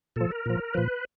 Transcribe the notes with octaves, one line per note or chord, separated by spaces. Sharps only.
A#2 F3 A4
A#4
A#2 F3
A#2 F3 B4